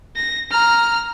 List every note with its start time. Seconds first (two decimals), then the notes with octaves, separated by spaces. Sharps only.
0.16 A#6
0.51 A#5 F6